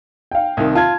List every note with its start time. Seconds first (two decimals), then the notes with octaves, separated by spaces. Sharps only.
0.31 F5 G5
0.57 C2 D#3
0.75 F4 A5 G#6